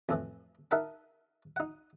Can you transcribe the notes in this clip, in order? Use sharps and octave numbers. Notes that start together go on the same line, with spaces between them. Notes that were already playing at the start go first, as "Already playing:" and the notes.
F2 A2 E3
D#4 A#4 E5 F#5 A5
D#4 F#5